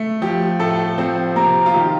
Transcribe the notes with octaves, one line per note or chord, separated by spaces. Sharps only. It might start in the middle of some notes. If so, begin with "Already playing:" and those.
Already playing: A3
F3 G4
A2 A3 A4
F3 C4 C5
C3 A#3 A#4
F4
D#3 G4